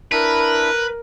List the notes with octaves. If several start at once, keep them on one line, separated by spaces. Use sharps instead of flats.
D4 E4 A#4 B4 B5